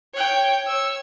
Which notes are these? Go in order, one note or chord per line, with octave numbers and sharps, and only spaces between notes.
C#5 G5
C#5 E6